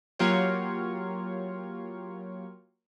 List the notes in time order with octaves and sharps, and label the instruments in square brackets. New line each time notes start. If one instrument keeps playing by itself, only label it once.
[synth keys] F#3 A#3 F4 G4 C#5